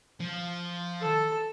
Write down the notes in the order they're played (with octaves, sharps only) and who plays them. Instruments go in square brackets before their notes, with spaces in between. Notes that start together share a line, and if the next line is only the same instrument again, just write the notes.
[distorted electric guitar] F3
[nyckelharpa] A4 A5